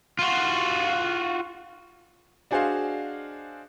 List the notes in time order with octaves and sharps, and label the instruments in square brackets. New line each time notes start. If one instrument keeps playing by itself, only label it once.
[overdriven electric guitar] F4 F#4
[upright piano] D4 F#4 G#4 C5 D#5 F5